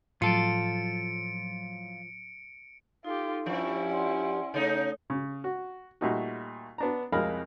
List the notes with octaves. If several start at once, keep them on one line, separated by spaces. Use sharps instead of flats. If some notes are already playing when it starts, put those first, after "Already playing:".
A2 F3 F#3 F4 A4 C#7 D7
D#4 F4 G4 A4
G2 F3 C#4 E4 C#6
D5 F#5 C6
C#3 A3 D#4 A4 C#5
C#3
F#4
A#2 G3 A3 D#4 F#4
B3 D4 A#5
C2 F2 G#3 A#4 F5 B5